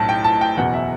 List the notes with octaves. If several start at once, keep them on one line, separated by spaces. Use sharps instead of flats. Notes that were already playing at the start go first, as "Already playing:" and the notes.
Already playing: B1 A2 F#3 A5
G5
A5
G5
F#1 E2 B2 F#5
E5